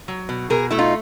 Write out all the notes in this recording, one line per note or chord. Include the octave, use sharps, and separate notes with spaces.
F#3
B2
B2 G#4 A#4
A3 E4
D#4 F4